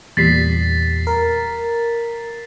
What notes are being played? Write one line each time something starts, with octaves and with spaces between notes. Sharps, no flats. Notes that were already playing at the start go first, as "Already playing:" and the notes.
E2 A#2 G3 A6 B6 C7
A#4